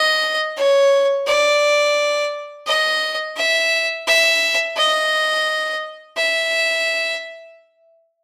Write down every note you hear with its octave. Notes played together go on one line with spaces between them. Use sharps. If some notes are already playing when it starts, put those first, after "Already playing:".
Already playing: D#5
C#5
D5
D#5
E5
E5
D#5
E5